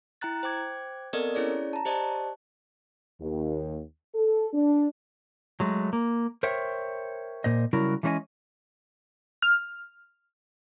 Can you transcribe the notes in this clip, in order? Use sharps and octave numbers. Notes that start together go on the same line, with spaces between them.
E4 G5 A#5 F#6 A6
C5 G5 D6 G#6
B3 C4 A4 A#4 D5 D#5
C#4 E4 G#4 C#5 D5
A5 A#5
G4 C5 D5 D#5 A5
D#2
A4
D4
F#3 G#3 A3
A#3
A#4 C5 C#5 E5 G5
A#2 C5 D#5
C#3 F#3 G3 E4 F#4 A#4
E3 G#3 C#4 A4 D#5 G#5
F6